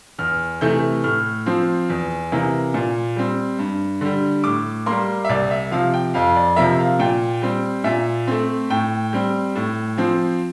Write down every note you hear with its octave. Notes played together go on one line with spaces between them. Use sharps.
E2 F6
C3 E3 A3 G6
A2 F6
F3 C4
E2
C3 E3 A#3
A#2
G3 C4
G2
D3 G3
A2 D6
G3 A#3 C6
E5
C2 D5
E5
C3 F3 F5
G5
F2 F5
D5
C3 F3 A#3 E5
F5
A#2 G5
G3 C4
A#2 E5
A3 C4
A2 G5
G3 C4
A2
F3 C4